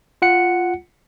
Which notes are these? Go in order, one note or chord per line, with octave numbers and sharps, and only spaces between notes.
F4 F#5 C#7